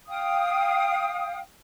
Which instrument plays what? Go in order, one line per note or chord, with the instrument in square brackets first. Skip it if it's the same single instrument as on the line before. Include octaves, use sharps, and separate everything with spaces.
[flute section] F5 G5 D#6